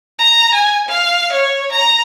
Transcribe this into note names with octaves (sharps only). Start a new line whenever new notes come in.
A#5
G#5
F5
C#5
A#5